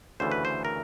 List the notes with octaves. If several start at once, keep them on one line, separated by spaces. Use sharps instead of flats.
D2 C#3 E3 A3 C5
B4
C5
A#4